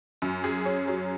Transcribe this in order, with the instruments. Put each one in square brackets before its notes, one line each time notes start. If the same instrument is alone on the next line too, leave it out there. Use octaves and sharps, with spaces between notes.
[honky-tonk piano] F#2
G#4
C#4
F#3